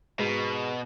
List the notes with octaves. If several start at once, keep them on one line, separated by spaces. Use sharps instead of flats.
G#2 B2